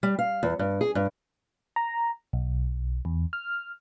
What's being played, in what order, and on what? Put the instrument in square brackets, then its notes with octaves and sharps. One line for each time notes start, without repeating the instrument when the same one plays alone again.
[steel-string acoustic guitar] G3
F5
E2
G2
G#4
G2
[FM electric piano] A#5
B1
E2
F6